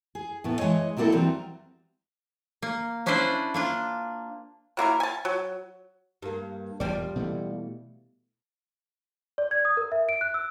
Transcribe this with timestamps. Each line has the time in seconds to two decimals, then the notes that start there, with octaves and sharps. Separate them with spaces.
0.15 G#4
0.44 A2 A3 B3
0.58 E3 G#3 A3 C#5 D#5
0.97 C3 F#3 G3 A#3 E4 A4
1.12 E3 F#3 G3 C4 A#5
2.62 A#3
3.06 C#4 D4 E4 B4 C5 D5
3.54 A#3 D4 F4
4.77 F#3 A#3 E4 A#4
5.00 G#5 A5
5.25 F#3
6.22 G2 A#3
6.80 E1 F3 G3 D5
7.16 B2 E3 A3
9.38 D5
9.51 G#6
9.65 D#6
9.77 A#4
9.92 E5
10.09 D7
10.21 F#6
10.34 E6